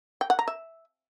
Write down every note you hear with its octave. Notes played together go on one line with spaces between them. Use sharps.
G5
F#5
A#5
E5